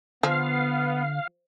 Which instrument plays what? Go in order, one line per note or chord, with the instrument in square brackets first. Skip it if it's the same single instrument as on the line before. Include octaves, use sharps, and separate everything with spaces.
[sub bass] D3 [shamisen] F3 [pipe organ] B3 [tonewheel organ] F5